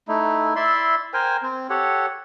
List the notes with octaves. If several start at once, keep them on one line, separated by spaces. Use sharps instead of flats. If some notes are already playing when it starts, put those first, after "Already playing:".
A3 D#4 E4
E4 D5 E5 C6
A#4 C5 G5 G#5
C4
G4 A4 C#5 F#5